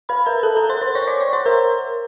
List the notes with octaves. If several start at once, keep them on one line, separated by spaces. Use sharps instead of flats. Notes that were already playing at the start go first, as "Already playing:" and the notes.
B4 B5
A#4 A#5
A4 A5
A#4 A#5
C5 C6
C5 C6
C#5 C#6
D5 D6
C#5 C#6
C5 C6
A#4 A#5